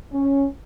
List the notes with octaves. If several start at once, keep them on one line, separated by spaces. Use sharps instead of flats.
C#4